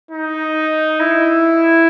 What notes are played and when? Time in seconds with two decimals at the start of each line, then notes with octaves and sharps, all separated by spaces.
0.11 D#4
1.00 E4